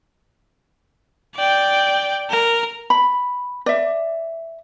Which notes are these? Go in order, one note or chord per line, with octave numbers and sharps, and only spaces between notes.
D5 G5
A#4
B5
D5 E5